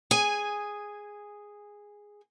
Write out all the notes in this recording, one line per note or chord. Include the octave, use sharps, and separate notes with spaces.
G#4 G#5